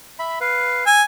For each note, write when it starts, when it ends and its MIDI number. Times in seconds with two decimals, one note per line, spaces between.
0.19 0.39 76
0.19 0.39 83
0.41 0.85 71
0.41 0.85 77
0.86 1.02 80
0.86 1.01 88